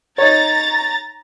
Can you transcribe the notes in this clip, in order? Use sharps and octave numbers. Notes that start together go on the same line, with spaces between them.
D#4 C#5 A#5 A6